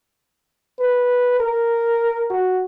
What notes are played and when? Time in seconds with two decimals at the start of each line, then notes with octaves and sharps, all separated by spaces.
0.79 B4
1.40 A#4
2.30 F#4